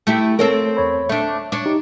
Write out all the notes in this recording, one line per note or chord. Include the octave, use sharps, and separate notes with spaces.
A3 E4 G4
A3 C4 A4 A#4 C#5
E2 C#5 B5
A3 D4 E5
D4 C#5
D#4 G4